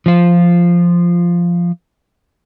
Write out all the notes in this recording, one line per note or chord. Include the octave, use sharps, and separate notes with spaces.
F3 F4